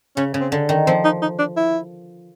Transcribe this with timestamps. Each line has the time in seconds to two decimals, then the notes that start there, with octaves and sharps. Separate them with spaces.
0.17 C#3 C#4
0.34 C#3
0.41 C4
0.52 D3
0.69 D#3
0.86 F3 C4
1.04 D#4
1.22 D#4
1.39 D4
1.57 E4